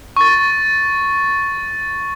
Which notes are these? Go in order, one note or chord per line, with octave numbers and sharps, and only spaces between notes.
C#6 A6